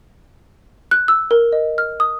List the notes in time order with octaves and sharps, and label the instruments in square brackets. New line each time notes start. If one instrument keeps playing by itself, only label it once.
[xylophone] F#6
E6
A#4
D#5
F6
D#6